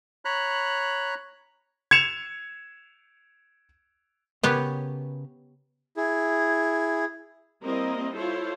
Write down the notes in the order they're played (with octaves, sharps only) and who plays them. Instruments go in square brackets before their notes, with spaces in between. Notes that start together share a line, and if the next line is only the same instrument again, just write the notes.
[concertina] C#5 A#5 B5 F#6
[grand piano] G#6 C#7 E7 F7
[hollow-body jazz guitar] C#3 A#4 B4 [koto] B3 G4 C#5
[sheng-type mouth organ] E4 G#4
[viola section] G3 A#3 C4 E4 A#4 D#5
E4 F4 A4 C5 C#5